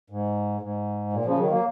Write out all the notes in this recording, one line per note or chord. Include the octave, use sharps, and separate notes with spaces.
G#2
G#2
A#2
C#3 F3
D#3 F#3
F#3 A#3